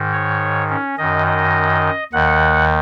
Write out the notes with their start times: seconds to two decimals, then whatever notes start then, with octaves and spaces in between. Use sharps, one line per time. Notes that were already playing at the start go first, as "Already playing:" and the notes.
Already playing: G#2 D#3
0.13 C#5
0.69 C#4
0.98 F#2 D#3 D#5
1.27 D#5
2.13 D#2 D#3 F#5